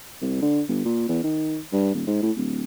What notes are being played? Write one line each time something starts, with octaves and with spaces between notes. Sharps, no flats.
C2
D3
G1
A#2
E2
D#3
G2
D#1
G#2
A2
D1